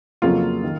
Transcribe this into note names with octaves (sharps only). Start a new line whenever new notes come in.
F2 C#3 F#3 A#3 F4
D#3